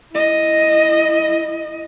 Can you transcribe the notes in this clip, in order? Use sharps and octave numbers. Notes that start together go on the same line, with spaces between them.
E4 D#5